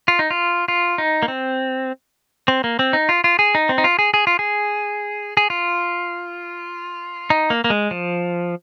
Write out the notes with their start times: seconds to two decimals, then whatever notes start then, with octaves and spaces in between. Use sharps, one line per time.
0.08 F4
0.19 D#4
0.31 F4
0.68 F4
0.98 D#4
1.23 A#3
1.28 C4
2.48 C4
2.64 A#3
2.79 C4
2.93 D#4
3.09 F4
3.24 F4
3.39 G#4
3.55 D#4
3.69 C4
3.78 D#4
3.84 F4
3.99 G#4
4.14 G#4
4.27 F4
4.39 G#4
5.37 G#4
5.50 F4
7.30 D#4
7.50 A#3
7.64 A#3
7.70 G#3
7.91 F3